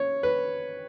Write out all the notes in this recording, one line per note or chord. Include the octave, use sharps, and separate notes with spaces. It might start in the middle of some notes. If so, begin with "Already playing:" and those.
Already playing: C#4 C#5
B4